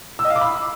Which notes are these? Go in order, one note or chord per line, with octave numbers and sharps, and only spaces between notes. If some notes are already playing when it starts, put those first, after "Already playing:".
E6
D#5
F5
D6
B5